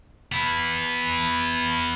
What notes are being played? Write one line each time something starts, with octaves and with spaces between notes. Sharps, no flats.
B3 E4